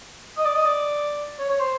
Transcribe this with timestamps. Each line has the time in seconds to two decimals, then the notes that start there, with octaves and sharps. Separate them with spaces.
0.37 D#5
0.45 D5
0.55 D#5
0.65 D5
1.39 C#5
1.49 C#5
1.60 C5